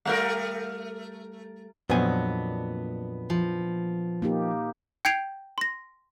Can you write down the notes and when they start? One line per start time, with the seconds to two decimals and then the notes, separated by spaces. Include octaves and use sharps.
0.05 G3 A3 A#4
1.90 F2 A#2 F#3 B3 D4 C5 D#5 G#5
3.30 F3
4.22 A#3 D#4 G4
5.05 G5 G6 G#6 C7 D7 F7
5.58 C6 A#6